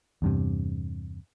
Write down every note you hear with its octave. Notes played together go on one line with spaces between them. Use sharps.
E2 G2 C3